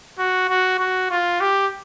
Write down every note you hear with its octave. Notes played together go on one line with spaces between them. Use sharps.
F#4
F#4
F#4
F4
G4